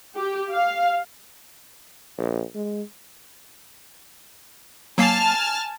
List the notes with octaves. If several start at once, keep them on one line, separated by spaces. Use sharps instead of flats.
G4
F5
A#1
G#3
F#3 A#3 G#5 A5 F6 C7